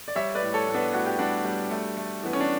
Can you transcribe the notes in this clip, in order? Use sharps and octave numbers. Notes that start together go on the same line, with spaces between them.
D5
G3 C#5 E5
B4 D5
A2
A4 C#5
A2
B3 D4
A2 F#4
G4
G3 D4 F#4
G3
A3
A3
E3 B3
C#4
D4